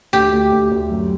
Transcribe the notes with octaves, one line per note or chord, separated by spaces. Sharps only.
D2 G4
D2
D2
D2
F#2